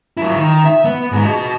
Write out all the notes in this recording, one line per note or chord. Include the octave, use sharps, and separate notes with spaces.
F#3 E4
D#3
E5
B3
G#2 G#3
F#4 D#5